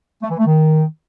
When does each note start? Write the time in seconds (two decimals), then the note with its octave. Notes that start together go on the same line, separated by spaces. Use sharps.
0.22 A3
0.30 E3
0.38 A3
0.46 D#3